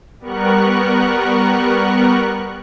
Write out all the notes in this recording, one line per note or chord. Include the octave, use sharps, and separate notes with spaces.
G3 B3 A#4 C#6 F#6